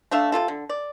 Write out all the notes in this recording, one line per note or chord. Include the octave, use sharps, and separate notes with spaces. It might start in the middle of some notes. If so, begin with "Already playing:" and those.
A3 D4 E5 F5
C3 G#3 F4 A4
D3
D5